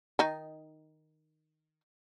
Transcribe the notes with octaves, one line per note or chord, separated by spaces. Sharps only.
D#3 D#4